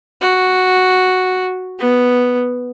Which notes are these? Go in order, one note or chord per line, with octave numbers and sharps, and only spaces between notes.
F#4
B3